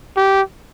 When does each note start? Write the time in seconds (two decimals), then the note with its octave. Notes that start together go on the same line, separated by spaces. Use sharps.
0.17 G4